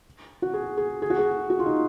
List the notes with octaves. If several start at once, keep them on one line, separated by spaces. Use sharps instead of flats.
F#4
G#4
G#4
G#4
F#4
G#4
F#4
F4
D#4